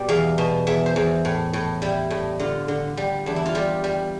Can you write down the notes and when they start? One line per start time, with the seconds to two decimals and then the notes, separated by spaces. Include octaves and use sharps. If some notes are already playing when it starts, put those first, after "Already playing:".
Already playing: B2 G3 D5
0.09 E2 F5
0.38 B2
0.67 E2 E5
0.86 C5
0.96 E2
1.25 A2
1.53 A2
1.82 G3 E4
2.10 A2
2.39 D3 F4
2.68 D3
2.97 G3
3.26 E2 D4
3.36 E4
3.46 F4
3.55 G3 G4
3.84 G3